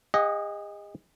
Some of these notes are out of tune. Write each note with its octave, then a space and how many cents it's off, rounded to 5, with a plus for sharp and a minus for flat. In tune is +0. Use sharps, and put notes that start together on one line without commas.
G#4 -45 D#5 +0 F#5 +0